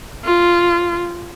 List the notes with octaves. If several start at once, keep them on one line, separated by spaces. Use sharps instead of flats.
F4